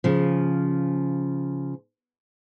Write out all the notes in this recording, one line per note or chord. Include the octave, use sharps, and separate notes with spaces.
C#3 F3